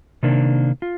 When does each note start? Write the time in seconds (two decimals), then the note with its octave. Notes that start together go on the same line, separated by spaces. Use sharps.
0.23 C3 D#3 A#3 D4
0.82 F4